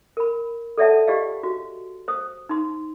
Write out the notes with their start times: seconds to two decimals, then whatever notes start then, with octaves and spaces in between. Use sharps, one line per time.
0.17 A#4 B5
0.78 A4 C#5 D5 E5 F#5 A5
1.07 F4 G4 D5 D#5 F5
1.43 F#4
2.08 C5 D#6
2.49 D#4 C6